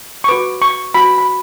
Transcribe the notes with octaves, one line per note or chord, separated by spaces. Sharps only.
C#6
F#4 B4 D6
C#6
F#4 B4 B5
B5